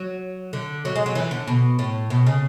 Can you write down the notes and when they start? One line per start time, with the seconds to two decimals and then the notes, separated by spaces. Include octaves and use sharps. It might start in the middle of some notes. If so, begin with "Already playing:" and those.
Already playing: F#3
0.53 D3
0.85 F#3
0.96 G#3
1.06 F#3
1.15 E3
1.31 D3
1.47 B2
1.79 A2
2.10 B2
2.26 C#3